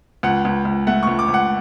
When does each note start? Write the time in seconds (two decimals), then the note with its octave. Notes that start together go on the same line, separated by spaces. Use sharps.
0.23 C#2 F#5
0.45 C#2
0.65 C#2
0.87 A3 F#5
1.03 C#2 C#6
1.19 D6
1.28 C#2
1.34 F#5